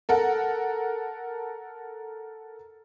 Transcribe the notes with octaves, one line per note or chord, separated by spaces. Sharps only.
A4 A#4 F#5